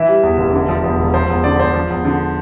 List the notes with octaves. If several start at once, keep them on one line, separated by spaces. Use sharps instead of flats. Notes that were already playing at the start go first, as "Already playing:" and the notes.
Already playing: E3 E5
G3
E2
F1
D3
F3
E2
E1
F3 C5
E2
D3 D5
E2 C5
F3
E2
D3